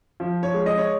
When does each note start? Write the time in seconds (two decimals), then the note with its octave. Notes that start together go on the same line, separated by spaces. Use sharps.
0.20 F3
0.43 C#5
0.54 G#3
0.66 D#5
0.78 C#5